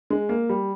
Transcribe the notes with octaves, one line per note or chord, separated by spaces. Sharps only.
G#3
A#3
G3